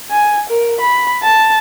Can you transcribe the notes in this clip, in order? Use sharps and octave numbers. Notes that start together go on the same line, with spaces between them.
G#5
A#4
B5
A5